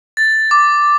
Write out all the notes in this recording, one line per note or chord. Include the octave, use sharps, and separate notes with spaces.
A6
D6